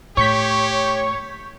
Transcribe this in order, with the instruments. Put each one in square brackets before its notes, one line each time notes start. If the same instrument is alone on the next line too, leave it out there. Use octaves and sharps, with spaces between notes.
[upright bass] A2 [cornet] G4 [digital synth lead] C#5 [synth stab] C#6 G6 B6